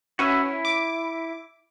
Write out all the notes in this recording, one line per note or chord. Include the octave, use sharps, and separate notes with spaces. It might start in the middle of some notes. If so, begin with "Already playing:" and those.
C#4 F#4 B4 E5
E4
D6